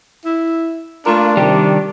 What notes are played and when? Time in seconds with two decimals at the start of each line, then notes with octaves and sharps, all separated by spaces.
0.25 E4
1.06 A3 A#3 D4 F4 A#4
1.37 C3 D#3 G3 G4